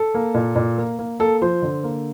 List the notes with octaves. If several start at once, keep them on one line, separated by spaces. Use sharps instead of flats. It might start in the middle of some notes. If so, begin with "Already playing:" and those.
Already playing: A4
A#3
A#2
A#2
A#3
A#3
A#3 A4
F3 C5
D3
A#3